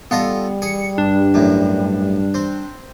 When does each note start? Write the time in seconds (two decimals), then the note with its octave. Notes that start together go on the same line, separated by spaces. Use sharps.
0.11 G3 B3 F4 A4 D#5
0.62 G#4 C#7
0.98 G2 D4
1.34 F#2 A2
2.34 C4